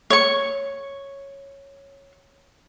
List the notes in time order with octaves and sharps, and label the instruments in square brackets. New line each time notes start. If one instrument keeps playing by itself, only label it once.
[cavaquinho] C#5 C#6